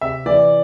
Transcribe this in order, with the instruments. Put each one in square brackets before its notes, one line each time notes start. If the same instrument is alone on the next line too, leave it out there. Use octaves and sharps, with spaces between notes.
[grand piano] C3 E5
E3 D5